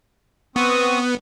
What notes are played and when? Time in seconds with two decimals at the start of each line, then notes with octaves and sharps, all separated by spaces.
0.56 B3 C4 C#6 D#6